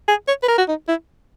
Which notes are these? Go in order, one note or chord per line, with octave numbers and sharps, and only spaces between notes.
G#4
C#5
B4
A#4
F#4
D#4
E4